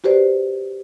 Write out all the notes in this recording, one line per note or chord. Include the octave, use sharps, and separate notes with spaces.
F#4 G4 B4 C5 D5